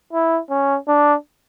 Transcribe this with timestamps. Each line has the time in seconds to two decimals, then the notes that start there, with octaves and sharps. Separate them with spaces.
0.13 E4
0.50 C#4
0.88 D4